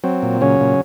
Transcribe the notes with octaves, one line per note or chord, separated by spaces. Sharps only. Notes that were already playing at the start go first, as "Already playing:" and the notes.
F#3 C4
A#2
C#3 F#3 C#4
A#2